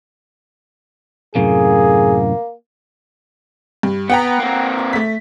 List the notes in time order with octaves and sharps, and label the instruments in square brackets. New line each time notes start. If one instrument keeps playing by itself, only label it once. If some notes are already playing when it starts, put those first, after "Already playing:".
[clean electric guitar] F#2 A2 C3 [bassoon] A#3 [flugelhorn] G#4
[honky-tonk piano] G2
[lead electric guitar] B3 [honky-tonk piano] F#5 G5 A#5
[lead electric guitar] A#3 C4
[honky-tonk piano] A3 B6